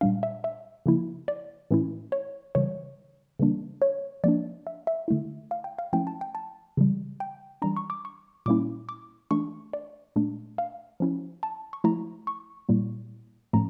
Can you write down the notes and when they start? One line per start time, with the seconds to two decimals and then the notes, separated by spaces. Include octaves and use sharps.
0.01 A#2 G3 D4 F5
0.23 E5
0.44 E5
0.86 C#3 F3 A#3 E4
1.28 D5
1.71 A2 E3 A3 C#4 E4
2.12 C#5
2.55 C#3 E3 G3 C#5
3.39 C#3 E3 G3 A#3 D4
3.82 C#5
4.24 F3 A#3 D4 D5
4.67 E5
4.87 E5
5.08 D3 A3 E4
5.51 F5
5.64 G5
5.78 F5
5.93 F3 A3 C#4 E4 G5
6.07 A5
6.21 G5
6.35 A5
6.77 C#3 E3 G3
7.20 G5
7.62 E3 G3 D4 A#5
7.76 C#6
7.90 D6
8.05 C#6
8.46 A#2 G3 A#3 C#4 E4 D6
8.89 D6
9.31 E3 A3 D4 C#6
9.73 D5
10.16 A#2 A3 D4
10.58 F5
11.00 F3 C#4 E4
11.43 A5
11.73 C#6
11.84 F3 A3 E4 A#5
12.27 C#6
12.69 A#2 G3 A#3 E4
13.53 A2 F3 A3 C#4 A#5